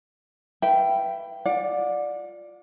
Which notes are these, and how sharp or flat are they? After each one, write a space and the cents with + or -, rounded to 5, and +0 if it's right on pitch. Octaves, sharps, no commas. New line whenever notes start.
B4 +0 E5 +35 G5 -10
F4 +0 D5 +5 F#5 -40